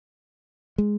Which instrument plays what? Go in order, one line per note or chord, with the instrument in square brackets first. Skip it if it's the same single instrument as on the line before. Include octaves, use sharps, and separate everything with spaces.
[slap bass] G#3